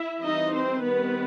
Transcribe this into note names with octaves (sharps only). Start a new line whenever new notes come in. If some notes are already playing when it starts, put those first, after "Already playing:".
Already playing: E4 E5
E3 G3 C4 D#4 D#5
C4 C5
D#3 G3 B3 C4 B4